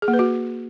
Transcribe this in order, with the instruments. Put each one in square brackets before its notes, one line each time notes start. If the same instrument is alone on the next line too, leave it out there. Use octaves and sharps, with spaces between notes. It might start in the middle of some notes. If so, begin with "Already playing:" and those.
[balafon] G#4
A#3
B4
F#4